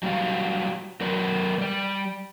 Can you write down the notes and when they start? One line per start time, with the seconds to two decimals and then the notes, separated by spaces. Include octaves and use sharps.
0.03 F#3 G3 G4 F5
1.01 F#3 A#4 B4 D5
1.58 G3 D5